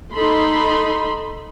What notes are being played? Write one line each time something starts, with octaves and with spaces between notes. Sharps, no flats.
D#4 A4 B5 C6